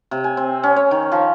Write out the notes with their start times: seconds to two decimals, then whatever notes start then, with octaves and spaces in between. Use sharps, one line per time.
0.11 C3
0.24 G#5
0.37 C4
0.63 C#4
0.76 C#5
0.91 D#3
1.12 F3